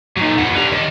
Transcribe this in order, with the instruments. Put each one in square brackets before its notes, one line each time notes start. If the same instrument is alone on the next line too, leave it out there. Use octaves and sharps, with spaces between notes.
[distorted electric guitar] A#2 [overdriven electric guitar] F#3 D#4
[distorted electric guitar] E2 [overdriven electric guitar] A#2 F#5
[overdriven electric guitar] G3 D4 [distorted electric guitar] B4 A#5
[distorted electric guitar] D#3 [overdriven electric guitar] D5 D#5